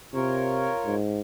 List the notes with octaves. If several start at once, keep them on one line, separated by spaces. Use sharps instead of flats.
C3 F4 A#4 C#5
G#2